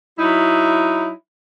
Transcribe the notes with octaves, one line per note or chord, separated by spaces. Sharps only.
F#3 D#4 E4